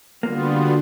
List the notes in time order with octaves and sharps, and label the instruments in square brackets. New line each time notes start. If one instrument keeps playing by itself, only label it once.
[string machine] D3 D4 F#4 [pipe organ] G3 B3 F4 [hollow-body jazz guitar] A#3